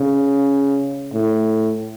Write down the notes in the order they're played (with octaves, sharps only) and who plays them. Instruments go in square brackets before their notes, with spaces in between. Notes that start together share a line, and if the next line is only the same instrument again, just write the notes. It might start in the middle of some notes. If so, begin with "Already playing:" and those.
Already playing: [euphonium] C#3
A2